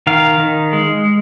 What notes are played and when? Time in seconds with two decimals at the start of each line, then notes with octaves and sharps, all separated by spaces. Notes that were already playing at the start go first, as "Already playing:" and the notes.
0.07 D#3 F5
0.40 D#3
0.73 G#3